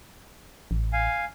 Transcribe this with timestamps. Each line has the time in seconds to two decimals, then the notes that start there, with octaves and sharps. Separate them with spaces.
0.71 A1
0.93 F5 G#5